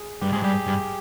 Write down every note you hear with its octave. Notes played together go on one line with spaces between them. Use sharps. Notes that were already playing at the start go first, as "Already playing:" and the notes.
Already playing: G#4
G2 G4
G#2 G#4
G2 G4
G2